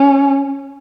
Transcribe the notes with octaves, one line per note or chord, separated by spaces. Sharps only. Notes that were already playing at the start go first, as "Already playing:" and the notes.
Already playing: C#4